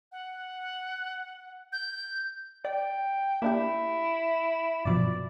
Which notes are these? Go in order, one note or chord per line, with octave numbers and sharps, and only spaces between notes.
F#5
G6
D5 G5
A#3 D4 E4 G4
G2 B2 F3 D5